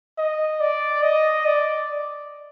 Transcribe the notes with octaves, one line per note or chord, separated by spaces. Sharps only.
D#5
D5
D#5
D5